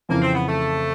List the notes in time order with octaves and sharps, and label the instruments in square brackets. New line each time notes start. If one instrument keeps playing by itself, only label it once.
[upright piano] F2 C#3 E3 [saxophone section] A#3
[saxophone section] C4
B3
A3